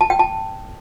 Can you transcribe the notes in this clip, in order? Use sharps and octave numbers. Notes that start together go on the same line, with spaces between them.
A5
G5
A5